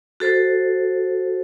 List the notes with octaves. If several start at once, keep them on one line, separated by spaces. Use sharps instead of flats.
F#4 A4 C5